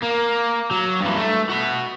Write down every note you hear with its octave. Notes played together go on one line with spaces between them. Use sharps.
A#3
F#3
G2 E3
A3
F#4 B5